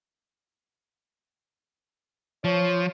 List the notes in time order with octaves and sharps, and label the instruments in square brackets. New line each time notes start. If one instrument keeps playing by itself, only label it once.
[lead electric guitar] F3 [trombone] C#5